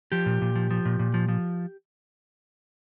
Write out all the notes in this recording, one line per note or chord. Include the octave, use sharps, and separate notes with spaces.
F3 G4
A#2
A#2
F3
F3
A#2
A#2
F3
F3